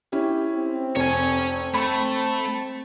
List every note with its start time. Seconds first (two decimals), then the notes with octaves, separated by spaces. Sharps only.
0.13 C#4 E4 G4
0.55 C4
0.96 F1 C#5 G#5
1.74 A3 B5